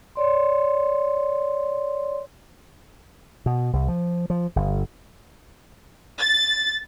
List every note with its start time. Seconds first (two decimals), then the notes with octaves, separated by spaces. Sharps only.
0.15 C#5 D5 C6
3.46 B2
3.73 C2
3.88 F3
4.30 F3
4.56 G1
6.18 A6